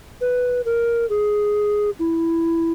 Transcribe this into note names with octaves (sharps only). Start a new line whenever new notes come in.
B4
A#4
G#4
E4